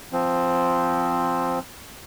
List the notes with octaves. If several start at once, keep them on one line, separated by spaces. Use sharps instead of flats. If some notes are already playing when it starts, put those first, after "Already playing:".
F3 C4